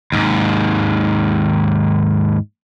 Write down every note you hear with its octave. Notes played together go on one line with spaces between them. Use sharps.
D#2 G#2